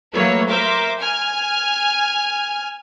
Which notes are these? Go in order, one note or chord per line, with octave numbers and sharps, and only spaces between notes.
F#3 A3 A#3 B4 C#5
A#4 C5 E5 D6
G#5 F6